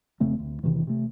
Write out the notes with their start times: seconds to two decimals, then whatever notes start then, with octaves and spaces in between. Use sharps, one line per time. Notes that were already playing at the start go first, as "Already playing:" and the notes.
0.20 F1 C#3 A3 C4
0.39 D2
0.63 E1 C3 D#3 E3
0.87 C3 A3